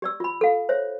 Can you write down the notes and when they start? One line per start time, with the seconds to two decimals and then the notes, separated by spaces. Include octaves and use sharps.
0.02 G4 D5 E6
0.20 F4 B5
0.41 A4 F5
0.69 C5 C#5 E5